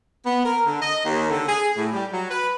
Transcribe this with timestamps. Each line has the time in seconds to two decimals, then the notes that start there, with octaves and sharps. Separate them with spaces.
0.25 B3
0.45 A#4
0.65 D3
0.81 D#5
1.04 D#2
1.29 D3
1.48 G#4
1.77 A2
1.92 G3
2.11 F#3
2.29 B4